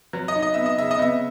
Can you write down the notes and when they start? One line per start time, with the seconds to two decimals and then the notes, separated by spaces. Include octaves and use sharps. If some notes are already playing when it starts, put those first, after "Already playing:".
0.13 F#3
0.28 D#5
0.35 D#4
0.42 D#5
0.54 B3 E5
0.66 D#5
0.78 C#3 E5
0.91 D#5
0.99 B3 E5